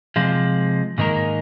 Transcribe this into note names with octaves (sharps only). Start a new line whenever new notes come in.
C3 F3 G#3
G#2 D#3 A#3 D#4 A#4